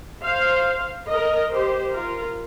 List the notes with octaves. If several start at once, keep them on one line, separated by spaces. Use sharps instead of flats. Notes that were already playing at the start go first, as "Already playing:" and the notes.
C5 F5
A#4 D#5
G4 C5
F4 A#4